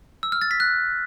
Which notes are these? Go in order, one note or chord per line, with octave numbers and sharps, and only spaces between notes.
E6
F6
A6
B6
F#6